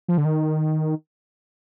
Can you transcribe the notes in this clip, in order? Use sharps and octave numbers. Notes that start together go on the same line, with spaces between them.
F3
D3
D#3